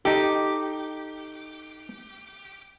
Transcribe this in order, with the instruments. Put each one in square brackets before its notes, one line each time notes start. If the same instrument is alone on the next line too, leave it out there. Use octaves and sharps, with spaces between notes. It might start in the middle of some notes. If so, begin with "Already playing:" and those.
[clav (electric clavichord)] D#4 A4 [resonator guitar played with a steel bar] G4